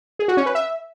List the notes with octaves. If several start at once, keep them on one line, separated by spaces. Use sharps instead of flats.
G#4
F#4
C#4
B4
E5